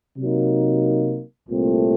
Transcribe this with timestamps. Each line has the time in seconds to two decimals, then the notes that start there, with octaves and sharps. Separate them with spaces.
0.18 C3 F#3 A#3 D#4
1.46 C2 A#2 A3 C4